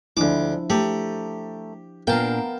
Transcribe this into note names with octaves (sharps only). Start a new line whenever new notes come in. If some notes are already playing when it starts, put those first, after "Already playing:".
D2 F3 G#3 D4 E4 D6
A3 G4 A#5
A#2 B3 D4 A#4 F5 G5 A5